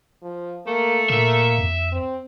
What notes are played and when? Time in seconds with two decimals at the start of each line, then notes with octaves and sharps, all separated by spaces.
0.22 F3
0.66 A3 A#3
1.10 A#2 A#3 E5
1.58 F2
1.92 C4